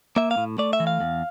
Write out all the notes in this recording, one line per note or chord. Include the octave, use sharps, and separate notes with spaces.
A#3 E5
F5
A2
A3 D5
E5
E3
F5
E2